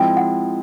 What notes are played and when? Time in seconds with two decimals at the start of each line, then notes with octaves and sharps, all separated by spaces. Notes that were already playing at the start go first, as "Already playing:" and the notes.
Already playing: F3 G#3 C4 E4 G5
0.17 F#5